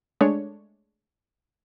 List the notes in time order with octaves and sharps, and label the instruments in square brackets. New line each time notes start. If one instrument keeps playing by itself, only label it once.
[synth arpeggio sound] G#3 A3 D4 C#5